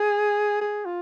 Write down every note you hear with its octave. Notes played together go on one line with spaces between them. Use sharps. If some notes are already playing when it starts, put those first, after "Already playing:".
Already playing: G#4
G#4
F4